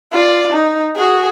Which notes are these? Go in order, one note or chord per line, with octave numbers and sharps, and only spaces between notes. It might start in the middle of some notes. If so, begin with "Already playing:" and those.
F4 D5
D#4
F#4 G#4